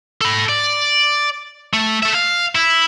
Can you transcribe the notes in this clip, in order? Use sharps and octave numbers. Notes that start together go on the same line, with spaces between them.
A4 B5
D5
A3
A4 E5
F5
E4